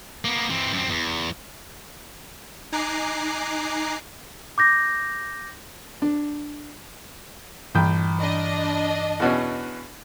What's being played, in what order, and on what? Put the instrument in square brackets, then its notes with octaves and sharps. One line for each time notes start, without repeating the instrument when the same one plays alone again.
[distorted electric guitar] A#3 B3
E3 C4
F#2 C4
E2
[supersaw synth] D#4 G#5 A#5 D6 F#6 C7
[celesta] D6 G6 A#6
[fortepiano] D4
[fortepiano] A#1 G5 [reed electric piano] G2 E3 G6
[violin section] D4 D#5
[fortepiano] E2 B2 C#4